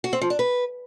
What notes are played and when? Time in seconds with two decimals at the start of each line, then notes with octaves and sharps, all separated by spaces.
0.04 F#4
0.13 C4
0.21 F3
0.30 D4
0.39 B4